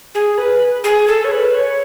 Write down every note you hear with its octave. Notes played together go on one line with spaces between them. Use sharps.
G#4
B4
G#4
A4
C#5
B4
C#5